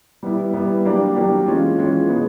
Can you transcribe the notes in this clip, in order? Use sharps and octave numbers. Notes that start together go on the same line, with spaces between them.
G3 B3 E4
G3 B3 E4
F#3 A#3 D4 G4
F#3 A#3 D4 G4
E3 G#3 C#4 F4
E3 G#3 C#4 F4
B2 G#3 B3